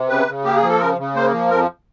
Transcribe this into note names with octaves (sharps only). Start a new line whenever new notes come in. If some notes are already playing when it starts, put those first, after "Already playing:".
Already playing: C3
C#3 B4
C#3
A#3 G4
G#4
F3
A4
C#3 A#4
C#3
A#3 C5
F3
F2 A#4